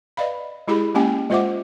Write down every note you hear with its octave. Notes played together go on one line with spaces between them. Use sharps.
B4 D5 D#5 F5 B5
G#3 E4 G4 G#4 B5
G#3 A#3 C#4 G4 G5 G#5
G#3 F4 C5 E5 F#5 D6